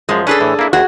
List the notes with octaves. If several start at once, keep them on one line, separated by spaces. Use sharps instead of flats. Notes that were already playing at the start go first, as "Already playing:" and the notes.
F#2 F3 G#3
C#4 D4 G#4 A4 B4
A2 E3
A#3 E4
D#2 F#4 G#4 F#5